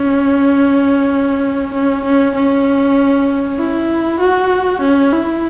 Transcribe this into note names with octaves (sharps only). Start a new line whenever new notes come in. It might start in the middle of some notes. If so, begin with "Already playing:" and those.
Already playing: C#4
C#4
C#4
C#4
E4
F#4
C#4
E4